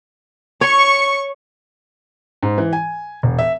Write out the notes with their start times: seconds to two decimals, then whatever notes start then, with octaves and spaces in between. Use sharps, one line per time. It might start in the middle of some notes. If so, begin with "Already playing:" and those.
0.61 C#5 C#6
2.43 G#2
2.58 E3
2.73 G#5
3.23 E1
3.39 E5